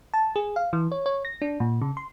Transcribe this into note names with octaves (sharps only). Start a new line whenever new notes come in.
A5
G#4
F5
E3
C#5
C#5
A#6
D4
A#2
C#3
C6